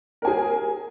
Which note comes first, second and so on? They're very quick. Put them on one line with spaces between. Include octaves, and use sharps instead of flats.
A#4 G#5 G#4